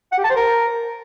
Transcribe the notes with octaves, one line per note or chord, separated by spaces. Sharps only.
F#5
G4
A5
C5
A#4